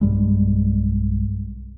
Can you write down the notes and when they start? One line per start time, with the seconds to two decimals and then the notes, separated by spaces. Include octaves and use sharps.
0.01 B1 G2 G3 G#3